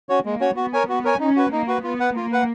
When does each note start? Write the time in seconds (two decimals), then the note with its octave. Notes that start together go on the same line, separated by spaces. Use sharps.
0.09 C#4 F#4 C#5
0.25 G#3 A#3
0.40 C#4 F#4 C#5
0.56 B3 F#4
0.73 A#4 C#5 G#5
0.89 B3 F#4
1.05 A#4 C#5 G#5
1.20 C#4 D#4
1.36 F#4 B4
1.52 A#3 D#4
1.68 F#4 B4
1.84 B3 F4
2.00 B4 F#5
2.16 A#3 F4
2.32 B4 F#5